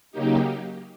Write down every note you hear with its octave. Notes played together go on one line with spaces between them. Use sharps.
C#3 F#3 A#3 D#4 G4